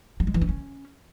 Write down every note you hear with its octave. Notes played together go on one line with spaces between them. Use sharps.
G3
G#3
E3
D4
C#4